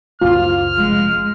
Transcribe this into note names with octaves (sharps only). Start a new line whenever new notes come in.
C#2 F#2 A#2 F4 F6
F1 G#3